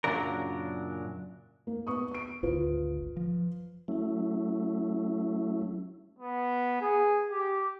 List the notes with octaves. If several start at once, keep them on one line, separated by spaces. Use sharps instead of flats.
F#2 A#2 C#3 F#3 D4 A#4
A#3
B3 C#6 D#6
C#6 D7
G#1 D2 F4 B4
F3
F#3 A3 C#4 E4
B3
G#4
G4